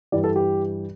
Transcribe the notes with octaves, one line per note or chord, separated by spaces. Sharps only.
G2 E3 G3 D5
A4
G4